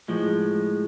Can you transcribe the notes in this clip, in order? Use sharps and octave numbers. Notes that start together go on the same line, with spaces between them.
A2 F3 G#3